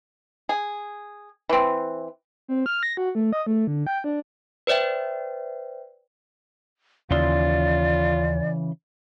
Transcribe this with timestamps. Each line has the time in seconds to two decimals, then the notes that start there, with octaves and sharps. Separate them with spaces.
0.49 G#4
1.49 E3 C4
2.48 C4
2.66 F6
2.83 A#6
2.97 F#4
3.15 A3
3.33 D#5
3.47 A3
3.67 D3
3.87 G5
4.04 D4
4.67 B4 C5 D5 E5 G5
7.11 D#2 C#3 E3 F4 D5 C6